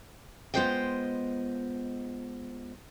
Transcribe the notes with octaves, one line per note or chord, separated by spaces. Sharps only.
G#3 B3 F4 C5 D#5 G5